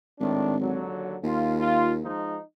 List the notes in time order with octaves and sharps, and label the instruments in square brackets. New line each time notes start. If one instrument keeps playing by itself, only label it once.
[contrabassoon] G#1 [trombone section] A2 D#3 D4
[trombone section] D#2 D3 F#3
[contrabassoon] D#2 [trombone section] F4
[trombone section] F4
F3 G#3 D#4